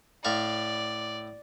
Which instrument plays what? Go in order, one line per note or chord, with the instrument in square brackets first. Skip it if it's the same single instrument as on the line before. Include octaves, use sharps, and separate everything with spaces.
[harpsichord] A2 F5 C#6 [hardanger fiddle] D5